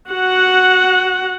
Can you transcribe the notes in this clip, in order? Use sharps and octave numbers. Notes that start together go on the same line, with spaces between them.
F#4 F#5